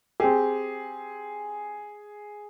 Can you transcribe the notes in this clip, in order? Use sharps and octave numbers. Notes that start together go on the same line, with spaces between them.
C4 G4 G#4